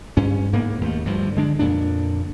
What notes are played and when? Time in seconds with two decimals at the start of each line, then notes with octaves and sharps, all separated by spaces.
0.17 G2 C#4
0.53 G#2 A#3 B3
0.81 D#2 G#3 A3
1.05 D2 G2 F3
1.36 D3 G#3 D4
1.59 F2 A#2 C#3 D4